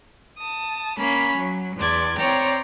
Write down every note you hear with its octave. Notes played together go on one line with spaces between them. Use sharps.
A5 D#6
A#3 C#4 B5
F#3
E2 D5 C6 G#6
C4 C#5 D5 G5 A#5